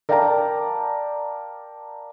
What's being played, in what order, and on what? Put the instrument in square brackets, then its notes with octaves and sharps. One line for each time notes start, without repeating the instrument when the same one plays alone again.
[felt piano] A#4 D5 F5 G5 A5 A#5